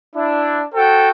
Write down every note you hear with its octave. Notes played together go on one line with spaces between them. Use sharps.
D4 E4
F#4 A4 C5 G5